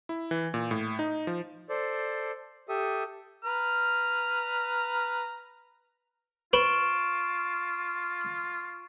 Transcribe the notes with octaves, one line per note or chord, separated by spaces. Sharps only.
E4
E3
A#2
A2
D#4
F3
A4 C5 D5
G4 A4 E5 D#6
B4 A#5 F6
F4 B4 C#6 D7 E7